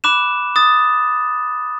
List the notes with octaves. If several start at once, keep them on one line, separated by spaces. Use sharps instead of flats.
B5 D6 F#6 E7
D#6 A6